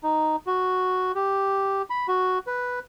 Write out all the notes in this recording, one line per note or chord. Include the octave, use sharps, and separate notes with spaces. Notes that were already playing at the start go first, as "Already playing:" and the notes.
D#4
F#4
G4
B5
F#4
B4